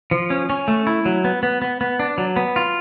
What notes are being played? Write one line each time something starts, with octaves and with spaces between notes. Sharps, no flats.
F3
C#4
C#4
A3
E4
F#3
B3
B3
B3
B3
D4
F#3
B3
F4